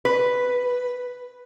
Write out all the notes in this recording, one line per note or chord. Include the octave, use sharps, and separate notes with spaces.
B4